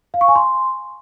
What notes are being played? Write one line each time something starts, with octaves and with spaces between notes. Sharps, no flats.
F5
C#6
G#5
C6